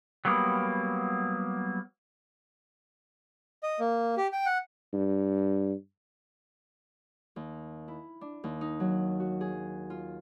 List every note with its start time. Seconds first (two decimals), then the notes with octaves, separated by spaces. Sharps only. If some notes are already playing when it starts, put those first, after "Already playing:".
0.25 F#3 G3 A#3 B3
3.63 D#5
3.80 A#3
4.17 G4
4.33 G5
4.46 F#5
4.93 G2
7.36 D#2
7.88 E4
8.21 D4
8.44 D#2
8.61 D#4
8.80 F#3
9.20 F#4
9.41 G#4
9.90 F4